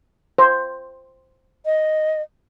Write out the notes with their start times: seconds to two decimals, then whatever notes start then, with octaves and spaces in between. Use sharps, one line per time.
0.38 C5
1.66 D#5